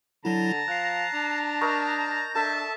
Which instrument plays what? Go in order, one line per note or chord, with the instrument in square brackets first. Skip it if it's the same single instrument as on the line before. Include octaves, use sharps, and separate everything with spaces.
[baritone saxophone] D3 [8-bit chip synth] F#3 E4 [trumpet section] A5 A#5
[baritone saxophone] F3 [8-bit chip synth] F#6 C7
[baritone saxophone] D4
[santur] A#4 D#5 C#6 [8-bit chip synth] G6 A#6
[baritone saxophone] D4 [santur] A4 [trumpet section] E5 A5